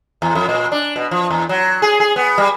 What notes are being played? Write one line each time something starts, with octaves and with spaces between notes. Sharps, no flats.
E2
F2
A#2
D4
B2
F3
E2
F#3
G#4
G#4
B3
G3